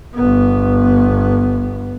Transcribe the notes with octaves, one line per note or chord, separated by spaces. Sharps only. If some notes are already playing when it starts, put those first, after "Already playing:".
G1 B3